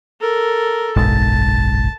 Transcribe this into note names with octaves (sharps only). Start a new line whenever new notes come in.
A4 A#4
F#1 B1 G#2 A5